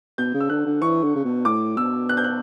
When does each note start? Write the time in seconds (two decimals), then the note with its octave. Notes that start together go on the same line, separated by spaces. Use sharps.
0.18 B2 G6
0.34 C#3
0.40 E6
0.50 D3 F#6
0.66 D3
0.82 E3 C#6
1.03 D3
1.15 C#3
1.25 B2
1.45 A2 D6
1.77 B2 E6
2.09 F#6
2.17 G6
2.24 F#6